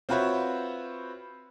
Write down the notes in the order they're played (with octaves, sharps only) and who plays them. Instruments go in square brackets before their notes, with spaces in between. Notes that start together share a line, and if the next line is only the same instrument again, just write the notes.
[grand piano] C4 F4 F#4 B4 C#5 E5